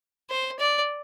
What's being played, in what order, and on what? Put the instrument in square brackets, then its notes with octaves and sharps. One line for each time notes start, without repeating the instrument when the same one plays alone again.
[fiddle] C5
D5